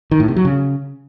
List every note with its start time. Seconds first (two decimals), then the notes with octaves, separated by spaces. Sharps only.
0.11 D#3
0.20 A2
0.28 C3
0.36 F#3
0.45 C#3